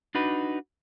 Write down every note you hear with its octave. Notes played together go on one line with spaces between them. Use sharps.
D4 D#4 F#4 B4